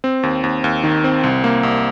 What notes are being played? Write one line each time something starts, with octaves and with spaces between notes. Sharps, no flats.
C4
D#2
D#2
D#2
D#3
C4
C2
A#3
C2